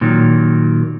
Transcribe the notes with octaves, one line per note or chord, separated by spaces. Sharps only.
A#2 D#3 F#3